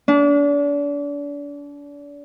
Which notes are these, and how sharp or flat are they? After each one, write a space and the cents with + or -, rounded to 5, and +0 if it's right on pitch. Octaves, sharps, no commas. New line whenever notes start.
D4 -35